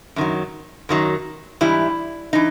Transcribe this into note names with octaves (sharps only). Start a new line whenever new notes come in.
F#2 D#3 F#3
F#2 D#3 F#3
G#2 E3 G3 E4
E3 D#4